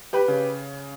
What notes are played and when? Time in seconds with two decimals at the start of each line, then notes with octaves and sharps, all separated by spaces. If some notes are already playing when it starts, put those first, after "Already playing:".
0.13 G4 B4
0.28 C#3